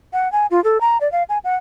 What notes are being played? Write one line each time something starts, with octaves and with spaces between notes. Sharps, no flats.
F#5
G#5
F4
A4
A#5
D5
F5
G#5
F#5